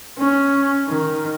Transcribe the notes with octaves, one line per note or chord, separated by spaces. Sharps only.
C#4
D#3